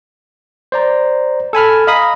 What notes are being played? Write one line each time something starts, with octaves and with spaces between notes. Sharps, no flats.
C5 D5 A#5
A4 G#5 B5 F6
D#5 F5 A#5 B5 D#6